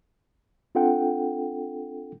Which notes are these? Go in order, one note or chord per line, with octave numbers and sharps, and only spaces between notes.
C4 D4 F4 A4 F#5 G5